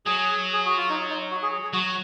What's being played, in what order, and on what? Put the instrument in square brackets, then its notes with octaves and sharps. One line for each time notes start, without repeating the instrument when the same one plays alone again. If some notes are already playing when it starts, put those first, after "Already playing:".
[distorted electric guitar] F#3 [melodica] G#4
[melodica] G#4
F#4
F4
D#4
D#4
F#4
G#4
G#4
[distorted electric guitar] F#3 [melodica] F#4